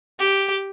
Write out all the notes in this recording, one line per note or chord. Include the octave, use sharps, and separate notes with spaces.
G4